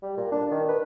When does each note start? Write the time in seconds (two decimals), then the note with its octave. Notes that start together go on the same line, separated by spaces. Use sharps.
0.02 G3
0.17 A#2
0.32 D4
0.51 D#3
0.68 B4